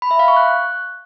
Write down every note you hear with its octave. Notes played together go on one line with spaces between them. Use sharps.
B5
E5
F5
C#6
F#6